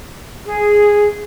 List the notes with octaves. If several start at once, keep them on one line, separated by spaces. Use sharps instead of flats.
G#4